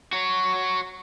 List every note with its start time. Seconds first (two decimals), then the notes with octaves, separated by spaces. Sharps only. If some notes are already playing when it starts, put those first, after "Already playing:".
0.13 F#4 C#5